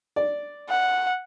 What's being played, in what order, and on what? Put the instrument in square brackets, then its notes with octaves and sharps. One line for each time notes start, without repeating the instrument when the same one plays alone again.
[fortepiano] D5
[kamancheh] F#5